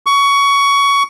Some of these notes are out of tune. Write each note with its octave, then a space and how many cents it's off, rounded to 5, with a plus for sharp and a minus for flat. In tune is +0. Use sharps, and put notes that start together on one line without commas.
C#6 +20